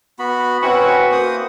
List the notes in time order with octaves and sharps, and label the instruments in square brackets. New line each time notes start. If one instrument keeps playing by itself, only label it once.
[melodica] B3 F#4 B5
[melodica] C4 C#4 E4 [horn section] F#4 B4
[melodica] A#3 C5 D#6